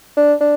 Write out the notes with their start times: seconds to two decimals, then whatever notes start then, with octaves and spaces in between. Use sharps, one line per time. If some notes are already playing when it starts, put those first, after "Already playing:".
0.17 D4
0.40 D4